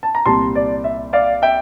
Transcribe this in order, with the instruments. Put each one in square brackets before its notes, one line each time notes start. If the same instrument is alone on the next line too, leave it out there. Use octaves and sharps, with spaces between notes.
[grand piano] A5
A#5
C2 A#2 G3 A5 C6
D5
E5
D5 F5
E5 G5